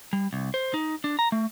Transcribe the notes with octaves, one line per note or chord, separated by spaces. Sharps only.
G3
C2
C5
D#4
D4
A#5
A3